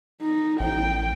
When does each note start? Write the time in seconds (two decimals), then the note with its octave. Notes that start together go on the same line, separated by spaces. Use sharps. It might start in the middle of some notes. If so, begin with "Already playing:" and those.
0.22 D#4
0.60 A1 G5